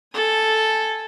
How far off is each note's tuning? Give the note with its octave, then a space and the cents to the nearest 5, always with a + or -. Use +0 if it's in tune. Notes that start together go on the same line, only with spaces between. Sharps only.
A4 +0 G#5 +0